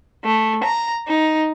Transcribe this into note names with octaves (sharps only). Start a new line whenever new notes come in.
A3
A#5
D#4